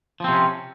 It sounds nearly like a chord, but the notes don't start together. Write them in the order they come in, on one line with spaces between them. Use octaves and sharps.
F3 C4 C3 C#4